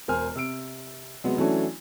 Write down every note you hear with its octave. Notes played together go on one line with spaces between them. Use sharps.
E1 A#4 C5 G#5 F6
C3 E6 D7
C3 F#3 G#3 B3 B4
E3 F#3 A3 C#4 D4